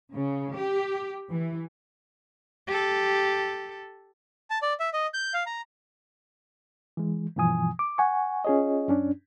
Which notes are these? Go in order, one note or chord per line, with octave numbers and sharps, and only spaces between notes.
C#3
G4
E3
G4 A4
A5
D5
E5
D#5
G6
F5
A#5
E3 G#3
G2 B2 E3 F3 G#5 D#6
D6
F#5 G#5 C#6
C#4 F4 G#4 C#5 D#5
F#2 C#4 D4